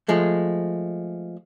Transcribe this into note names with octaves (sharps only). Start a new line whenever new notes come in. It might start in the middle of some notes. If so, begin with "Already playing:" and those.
F3 G#3 A3